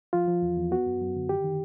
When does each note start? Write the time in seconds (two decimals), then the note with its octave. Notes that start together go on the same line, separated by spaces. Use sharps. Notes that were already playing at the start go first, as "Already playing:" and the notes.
0.13 F3 F4
0.28 F3
0.42 E2
0.57 E2
0.71 B3 F#4
0.86 F#2
1.01 F#2
1.16 D3
1.29 D#3 G4
1.44 D#3